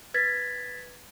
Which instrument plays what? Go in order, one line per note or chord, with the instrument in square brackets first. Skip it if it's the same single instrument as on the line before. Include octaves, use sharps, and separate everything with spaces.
[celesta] B4 G#6 A6 B6